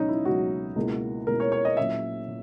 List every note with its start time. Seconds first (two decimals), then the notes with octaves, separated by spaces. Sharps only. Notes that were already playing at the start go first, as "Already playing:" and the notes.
Already playing: C#2 B2 F#3 C#4 D#4
0.09 E4
0.25 C#2 B2 F#3 F#4
0.76 C#2 B2 A#3 E4
1.27 C#2 B2 A#3 E4 A#4
1.40 C#5
1.52 C#5
1.65 D#5
1.77 A#2 F#3 C#4 E4 E5
2.28 A#2